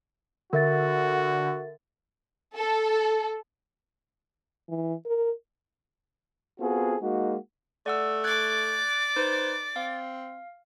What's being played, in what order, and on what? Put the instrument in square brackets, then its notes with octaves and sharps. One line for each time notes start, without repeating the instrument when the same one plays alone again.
[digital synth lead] D3 [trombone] F#4 [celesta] A#4 E5 A6
[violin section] A4
[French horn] E3
A#4
[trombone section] B3 C4 F4 F#4 G#4 A4
G#3 A#3 D#4 F#4
[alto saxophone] A3 [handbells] D5 F#5 E6
[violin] D5 D6 [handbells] F#6 G#6 [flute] A6
[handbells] D#4 B4 [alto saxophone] C5
[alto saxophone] C4 [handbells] F5